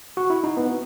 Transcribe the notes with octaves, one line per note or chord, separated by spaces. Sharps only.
F#4
E4
D#4
B3